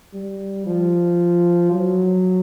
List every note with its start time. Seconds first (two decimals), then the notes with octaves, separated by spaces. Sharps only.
0.14 G3
0.67 F3
1.72 F#3